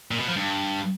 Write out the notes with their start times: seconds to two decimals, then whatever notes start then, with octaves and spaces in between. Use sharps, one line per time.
0.11 A#2
0.20 B2
0.28 F3
0.36 G2